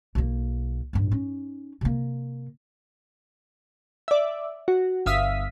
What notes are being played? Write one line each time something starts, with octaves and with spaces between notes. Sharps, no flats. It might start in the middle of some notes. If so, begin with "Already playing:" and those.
B1 A#3
A1 G2
C#4 D#4
C3 A#3
D5 E5
F#4
G1 E5 F5 D#6 B6